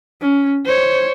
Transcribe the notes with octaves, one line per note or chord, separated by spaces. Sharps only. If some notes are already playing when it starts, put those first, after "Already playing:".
C#4
C5 C#5